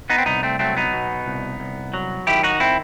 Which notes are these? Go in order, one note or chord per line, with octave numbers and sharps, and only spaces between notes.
B3 D#4
C4
C2 B3 D#4
A3 C4
F#3 A3 C4
B3 D#4
B2
C2
C2
F#3
D#3 E4 G4
D#4 F#4
C4 E4